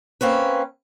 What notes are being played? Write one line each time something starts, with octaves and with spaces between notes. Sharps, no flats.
A#3 C4 C#4 B4